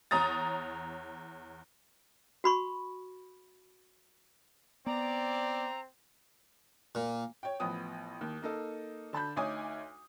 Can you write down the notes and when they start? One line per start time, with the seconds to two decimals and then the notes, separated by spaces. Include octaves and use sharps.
0.11 E2 C#5 A#5 D#6 A6
2.44 F#4 B5 C#6
4.86 B3 C4 D5 A#5
6.95 A#2
7.43 C#5 G5
7.60 A1 F3 B3 G5 D#6
8.21 D#2
8.42 A#3 D#4 A4
9.13 D3 A5 B5 G6
9.36 D2 D#4 C#5 G#5 D6 D#6